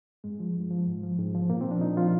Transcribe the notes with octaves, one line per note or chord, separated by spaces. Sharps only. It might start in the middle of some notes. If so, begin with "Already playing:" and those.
G2 G#3
F3
G2
F3
G#2
F3
G#2
F3
A#2 A#3
F3 C4
D4
A#2 D#4
F3 F4